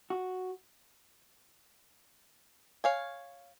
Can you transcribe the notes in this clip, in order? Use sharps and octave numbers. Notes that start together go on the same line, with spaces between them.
F#4
C#5 F5 G#5